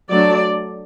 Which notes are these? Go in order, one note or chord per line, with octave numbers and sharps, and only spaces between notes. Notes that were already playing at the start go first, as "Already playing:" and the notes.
F#3 A3 D4 D5